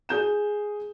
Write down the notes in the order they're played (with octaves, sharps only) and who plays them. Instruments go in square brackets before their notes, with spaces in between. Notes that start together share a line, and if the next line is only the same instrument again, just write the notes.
[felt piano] G#4 G6 E7